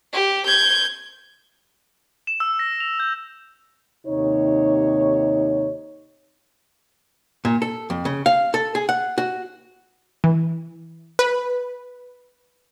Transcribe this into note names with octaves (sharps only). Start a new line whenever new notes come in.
G4
G6 G#6
E7
E6
A#6
F7
G6
D#2 C3 D#4 C#5
A#2
A4
F2
C#3
F5
A4
G#4
F#5
F#4
E3
B4